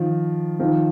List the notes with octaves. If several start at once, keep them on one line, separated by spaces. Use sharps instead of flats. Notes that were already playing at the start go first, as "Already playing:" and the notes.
Already playing: D#3 F3
D#3 F3